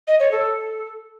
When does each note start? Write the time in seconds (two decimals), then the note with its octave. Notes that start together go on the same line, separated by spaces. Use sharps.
0.08 D#5
0.20 C#5
0.32 A4